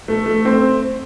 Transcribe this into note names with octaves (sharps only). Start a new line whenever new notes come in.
A3
A3
C4